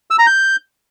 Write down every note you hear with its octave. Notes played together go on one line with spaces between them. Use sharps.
E6
A#5
G6